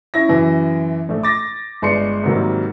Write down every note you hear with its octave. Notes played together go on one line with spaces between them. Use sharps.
C#4 E4 A#6
F#2 E3
A#1 A3
D6 A6 A#6
G1 G#3 D5 C6 C7 C#7
G#2 C3 D#3 F#3 G3 A#3